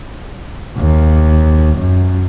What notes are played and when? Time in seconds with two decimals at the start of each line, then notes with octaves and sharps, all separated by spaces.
0.78 D#2
1.79 F#2